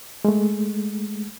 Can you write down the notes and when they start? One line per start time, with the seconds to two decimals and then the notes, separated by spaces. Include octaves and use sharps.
0.25 G#3 A3